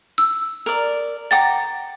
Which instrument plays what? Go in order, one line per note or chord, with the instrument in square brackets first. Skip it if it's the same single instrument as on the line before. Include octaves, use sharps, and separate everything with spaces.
[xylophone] E6
[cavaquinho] A#4 D5
[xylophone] F#5 A6 [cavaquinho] G5 A#5 D6